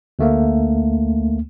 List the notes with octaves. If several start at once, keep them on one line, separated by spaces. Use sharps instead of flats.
D2 A3 A#3